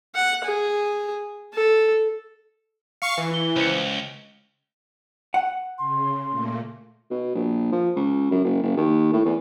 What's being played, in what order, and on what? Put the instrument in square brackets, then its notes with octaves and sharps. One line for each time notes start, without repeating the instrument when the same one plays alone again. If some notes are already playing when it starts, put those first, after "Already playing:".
[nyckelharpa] F#5
G#4
A4
[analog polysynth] F5 C#6 C7 [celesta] C#7
[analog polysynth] E3
[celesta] E4 G7
[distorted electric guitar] C#2 [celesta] C5 C#7
[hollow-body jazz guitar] F#5
[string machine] C#3 [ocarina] C6
[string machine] A#2 A3 A#3
[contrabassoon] B2
A#1
F3
C#2
F#2
F#1
F#1
D#2
A2
E2